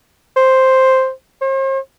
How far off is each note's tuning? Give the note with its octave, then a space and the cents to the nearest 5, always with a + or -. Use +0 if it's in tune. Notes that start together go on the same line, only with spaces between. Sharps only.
C5 +0
C5 +45